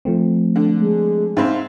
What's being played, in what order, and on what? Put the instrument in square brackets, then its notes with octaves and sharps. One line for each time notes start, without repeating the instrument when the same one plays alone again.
[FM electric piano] F3 A3 C4
[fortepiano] D3
[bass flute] G#3
[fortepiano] G#2 C4 [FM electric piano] E5 F5 B5